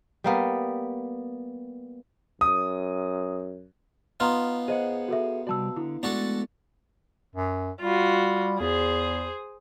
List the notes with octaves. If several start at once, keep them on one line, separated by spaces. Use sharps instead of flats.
G3 A#3 B3
F#2 D#6
B3 D#4 F4 A#5 C6 F6
G#4 C5 D#5 F#5
F#4 A4 E5
C3 G3 F#4 D5 A5 E6
D3 E4
G#3 A3 B3 D4 F#4 A4
F#2
G3 F4 F#4
E2 G#4 C5